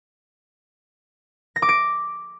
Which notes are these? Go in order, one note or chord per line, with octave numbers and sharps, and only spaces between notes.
A#6
D6
D7